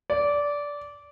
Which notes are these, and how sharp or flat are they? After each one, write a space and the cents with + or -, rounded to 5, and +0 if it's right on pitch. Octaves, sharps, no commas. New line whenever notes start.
D5 -15